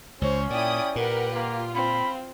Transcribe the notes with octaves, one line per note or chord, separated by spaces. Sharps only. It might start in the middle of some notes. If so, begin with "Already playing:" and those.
C#2 C#4 C5 C#5
A#2 E4 D5 G5 D#6
A#2 G4 A#4 B4 F#5
A#3 F4
C4 B5